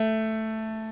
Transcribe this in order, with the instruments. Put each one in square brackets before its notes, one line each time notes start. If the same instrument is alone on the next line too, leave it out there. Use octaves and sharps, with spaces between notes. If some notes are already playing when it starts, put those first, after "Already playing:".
Already playing: [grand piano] A3